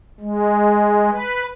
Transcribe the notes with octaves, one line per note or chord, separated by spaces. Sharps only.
G#3
B4